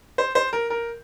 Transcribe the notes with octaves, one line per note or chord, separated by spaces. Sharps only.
C5
C5
A#4
A#4